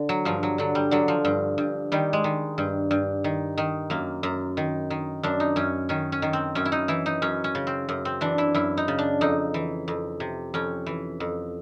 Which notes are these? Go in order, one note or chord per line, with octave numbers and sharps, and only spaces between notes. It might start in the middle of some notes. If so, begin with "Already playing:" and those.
Already playing: D3
F#3
G2 F3
F#3
D3 F#3
G3
D3 F#3
F3
G2
G2
D#3 G3
G#3
D#3
G2
G2
D#3
D#3
F#2 A#3
F#2
D#3
D#3
F#2 D4
D#4
F#2 C#4
D#3 C#4
C#4
D#3
C4
F#2 C#4
E4
D#4
E3 E4
D#4
F#2 C#4
C#4
C#3
C4
F#2
C4
E3 D4
E4
F#2 E4
D#4
C#3
D4
F2 D#4
E3
F2
C3
F2 C#4
E3
F2